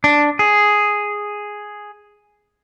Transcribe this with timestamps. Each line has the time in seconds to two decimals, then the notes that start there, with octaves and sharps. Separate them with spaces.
0.04 D4
0.39 G#4